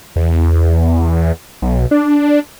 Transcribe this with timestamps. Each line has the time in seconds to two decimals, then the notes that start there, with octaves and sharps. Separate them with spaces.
0.16 E2
1.62 B1
1.91 D4